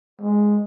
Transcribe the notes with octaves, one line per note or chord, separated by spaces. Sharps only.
G#3